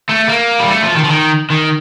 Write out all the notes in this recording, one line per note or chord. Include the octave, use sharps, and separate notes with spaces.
A3
A#3
G3
A3
F3
D#3
F3
D#3
D#3